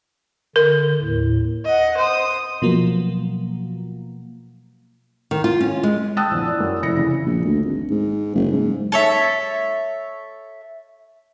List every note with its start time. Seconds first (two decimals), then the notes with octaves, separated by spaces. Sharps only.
0.56 D3 A#4
1.00 D#2 A2
1.65 D#5 F#5
1.98 C5 D#6
2.62 B2 F3 F#3 A#3
5.31 D#3
5.44 F4
5.61 C#4
5.83 G#3
6.17 G5 A5 D#6 E6 F#6 A6
6.31 A#1 E2
6.47 E4 D5
6.60 F#2
6.83 F1 E4 D5 A#6 C#7
6.97 C#3 E3
7.26 A#1
7.45 D2
7.65 G#1
7.91 G#2
8.35 F#1
8.52 G#2
8.92 A4 C#5 E5